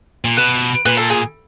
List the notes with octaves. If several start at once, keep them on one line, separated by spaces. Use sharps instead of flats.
A#2
B2 B4
A#2 B4
A4
G#4